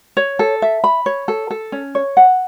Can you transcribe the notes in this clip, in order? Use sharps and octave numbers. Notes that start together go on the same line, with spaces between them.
C#5
A4
E5
B5
C#5
A4
A4
C#4
C#5
F#5